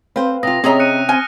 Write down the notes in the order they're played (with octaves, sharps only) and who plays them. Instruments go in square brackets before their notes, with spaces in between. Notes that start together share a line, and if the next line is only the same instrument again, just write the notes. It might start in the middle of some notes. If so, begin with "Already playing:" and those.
[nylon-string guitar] C4 C5 [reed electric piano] B4 F5
[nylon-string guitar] C3 F4 [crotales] D#6 A#6
[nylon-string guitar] C3 C#4 E5 [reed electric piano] C4 C#5 [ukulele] G#4 D#5 A#5
[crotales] F#6 C#7 D#7
[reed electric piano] C4 [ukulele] G#5 [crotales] F6 A#6